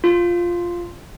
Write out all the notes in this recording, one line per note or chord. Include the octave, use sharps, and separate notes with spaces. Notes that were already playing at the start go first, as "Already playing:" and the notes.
F4